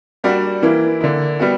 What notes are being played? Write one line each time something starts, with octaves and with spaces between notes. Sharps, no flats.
G3 A#3 D4 F#4
E3 A#3 E4
D3 A#3 E4
G3 B3 F#4